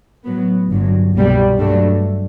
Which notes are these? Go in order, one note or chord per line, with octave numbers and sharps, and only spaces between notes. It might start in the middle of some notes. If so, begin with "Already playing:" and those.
A2 F#3 B3
G1 G2 F#3
C2 B2 G3
G2 F#3 A3 D4